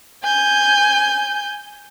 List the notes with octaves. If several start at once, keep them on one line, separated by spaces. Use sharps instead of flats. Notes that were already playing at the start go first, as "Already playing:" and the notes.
G#5 G6